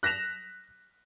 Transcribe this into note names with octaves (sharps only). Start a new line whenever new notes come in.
F#6 A#6 B6 E7 F7